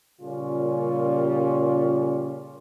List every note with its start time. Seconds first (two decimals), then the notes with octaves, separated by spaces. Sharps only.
0.22 A#2 C#3 G3 C#4 F4